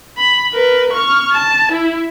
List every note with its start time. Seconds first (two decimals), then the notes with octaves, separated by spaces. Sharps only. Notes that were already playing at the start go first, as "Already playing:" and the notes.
0.17 B5
0.53 A#4 B4
0.93 C#6 F6
1.33 A5
1.72 E4